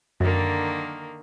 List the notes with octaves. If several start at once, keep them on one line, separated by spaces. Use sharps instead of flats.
F#2 D3 D#3 A#3